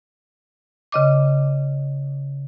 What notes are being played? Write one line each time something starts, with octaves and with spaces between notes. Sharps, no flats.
C#3 D#5 D6